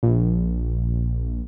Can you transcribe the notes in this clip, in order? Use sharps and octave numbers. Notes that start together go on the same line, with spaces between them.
A#1